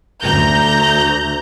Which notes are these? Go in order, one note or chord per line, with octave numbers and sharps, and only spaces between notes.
D2 A#5 G6